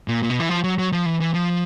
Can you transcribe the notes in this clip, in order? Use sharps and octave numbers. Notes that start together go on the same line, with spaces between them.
A#2
A#2
B2
E3
F3
F#3
F#3
F3
E3
E3
F3